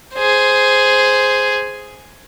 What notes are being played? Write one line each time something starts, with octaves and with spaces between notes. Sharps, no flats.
G#4 C5